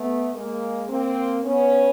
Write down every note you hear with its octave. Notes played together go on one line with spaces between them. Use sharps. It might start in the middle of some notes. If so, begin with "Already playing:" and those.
Already playing: A3 B3
G#3 A#3
A#3 C4
B3 C#4